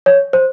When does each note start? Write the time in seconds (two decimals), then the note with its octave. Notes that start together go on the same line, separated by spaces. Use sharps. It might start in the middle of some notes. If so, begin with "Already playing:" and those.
0.06 C#5
0.33 C5